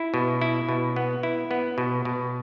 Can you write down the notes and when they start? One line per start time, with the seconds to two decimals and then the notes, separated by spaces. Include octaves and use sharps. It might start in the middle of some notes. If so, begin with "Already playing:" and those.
Already playing: E4
0.14 B2
0.41 E4
0.69 B2
0.96 B3
1.23 E4
1.51 B3
1.78 B2
2.05 B2